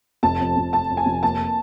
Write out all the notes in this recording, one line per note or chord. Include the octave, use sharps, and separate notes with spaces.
F1 A5
F2
F1
C3 A5
F2
G#5
F1
A#3 A5